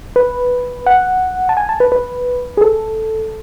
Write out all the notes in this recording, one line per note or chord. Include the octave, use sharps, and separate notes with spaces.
B4
F#5
A5
G#5
A5
B4
B4
G#4
A4